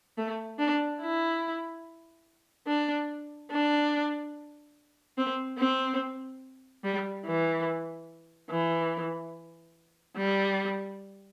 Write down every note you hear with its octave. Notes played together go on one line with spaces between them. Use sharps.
A3
D4
E4
D4
D4
C4
C4
G3
E3
E3
G3